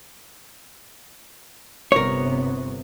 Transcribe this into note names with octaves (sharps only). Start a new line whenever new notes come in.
G1 C3 B3 A#4 C#5